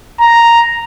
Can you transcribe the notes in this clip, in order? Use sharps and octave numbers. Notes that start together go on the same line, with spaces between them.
A#5